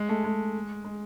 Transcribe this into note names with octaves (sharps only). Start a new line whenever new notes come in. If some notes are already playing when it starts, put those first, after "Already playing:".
Already playing: G#3
A3
G#3
G#3